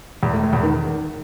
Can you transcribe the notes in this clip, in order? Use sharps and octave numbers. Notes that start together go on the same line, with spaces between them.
E2
A2
A2
E2
D#3